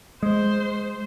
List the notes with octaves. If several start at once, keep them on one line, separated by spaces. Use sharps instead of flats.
G#3 C5